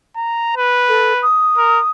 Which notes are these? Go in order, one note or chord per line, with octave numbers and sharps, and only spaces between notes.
A#5
B4
A4
D#6
A#4